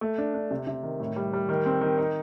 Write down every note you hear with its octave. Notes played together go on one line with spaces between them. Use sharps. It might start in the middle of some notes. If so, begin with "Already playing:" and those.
A3
D4
D4
C3
C3
D#3
A2
G3
G3
D#3
C4
D#3
D#4